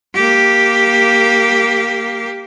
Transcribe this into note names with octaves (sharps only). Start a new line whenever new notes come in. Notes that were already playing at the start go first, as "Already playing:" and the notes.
A#3 G4